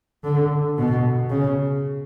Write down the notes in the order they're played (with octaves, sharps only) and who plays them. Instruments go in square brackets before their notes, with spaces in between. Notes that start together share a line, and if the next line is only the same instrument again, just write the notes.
[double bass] D3
B2
C#3